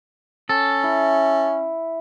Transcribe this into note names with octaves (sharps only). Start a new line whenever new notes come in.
C#4 A4
E4